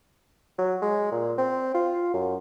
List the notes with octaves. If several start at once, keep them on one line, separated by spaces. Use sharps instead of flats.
F#3
G#3
A#2
C4
F4
F#2